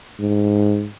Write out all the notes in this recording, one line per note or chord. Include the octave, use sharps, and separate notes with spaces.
G#2